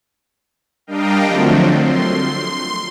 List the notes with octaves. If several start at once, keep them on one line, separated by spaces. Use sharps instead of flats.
G3 D4 A#4 D#5 F5 G5
D3 F3 F#3 A3 C4
C6